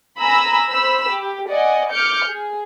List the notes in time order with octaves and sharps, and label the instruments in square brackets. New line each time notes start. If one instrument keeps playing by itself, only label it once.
[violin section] G#5 A#5 B5 E6
C5 B5 E6
G4
D5 D#5 F#5 G#5
D6 F6 G6 C#7
G#4